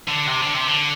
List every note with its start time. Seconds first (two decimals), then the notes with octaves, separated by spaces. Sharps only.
0.08 D3
0.27 C3
0.41 D3
0.54 C3
0.67 D3